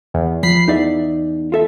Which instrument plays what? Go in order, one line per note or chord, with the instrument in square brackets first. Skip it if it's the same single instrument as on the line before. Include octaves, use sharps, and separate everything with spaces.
[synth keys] E2
[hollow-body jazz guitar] F3 [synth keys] B5 C7
[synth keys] E2 [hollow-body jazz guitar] D#4 D5 E5
[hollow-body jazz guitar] F4 A4 E5